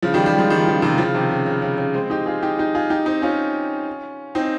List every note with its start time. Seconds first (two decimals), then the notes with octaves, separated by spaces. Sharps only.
0.02 C#3 F3
0.14 D#3 G3
0.26 D#3 G3
0.38 F3 G#3
0.50 D#3 G3
0.67 C#3 F3
0.82 C3 D#3
0.98 C#3 F3
1.14 C3 D#3
1.31 C#3
1.46 C#3
1.62 C#3
1.78 C#3
1.94 G#3 C4
2.10 D#4 G4
2.26 F4 G#4
2.42 D#4 G4
2.58 D#4 G4
2.74 F4 G#4
2.90 D#4 G4
3.06 C4 D#4
3.22 C#4 F4
4.35 C4 D#4